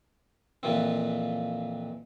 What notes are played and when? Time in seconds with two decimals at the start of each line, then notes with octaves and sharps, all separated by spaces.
0.63 F2 A#2 E3 C4